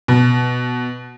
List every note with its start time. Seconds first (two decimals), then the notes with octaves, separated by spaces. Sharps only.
0.08 B2